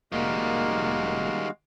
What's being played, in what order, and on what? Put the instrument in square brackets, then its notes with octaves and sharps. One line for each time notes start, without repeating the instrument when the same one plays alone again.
[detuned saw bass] F1 [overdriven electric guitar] D#3 G3 [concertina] G#3 F#4 F5 [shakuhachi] A#3